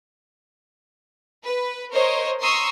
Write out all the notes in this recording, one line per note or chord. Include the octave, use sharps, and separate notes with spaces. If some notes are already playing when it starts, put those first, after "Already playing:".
B4
A#4 C5 C#5 D#5
A#5 C6 C#6 D#6 E6